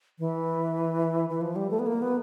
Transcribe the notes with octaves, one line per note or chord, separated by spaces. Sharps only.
E3
E3
F3
G3
A3
B3
A#3
B3